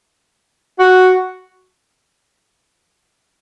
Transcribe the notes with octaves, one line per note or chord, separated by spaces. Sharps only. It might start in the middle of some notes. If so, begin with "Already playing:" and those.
F#4